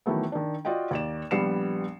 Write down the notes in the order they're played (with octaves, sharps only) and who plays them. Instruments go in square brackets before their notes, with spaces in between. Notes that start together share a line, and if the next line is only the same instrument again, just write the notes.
[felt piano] D#3 E3 F#3 A3 B3
D#3 D4
F4 F#4 D5 D#5 F5 G5
D#2 D5 E7
A#1 G3 B3 C7 C#7 E7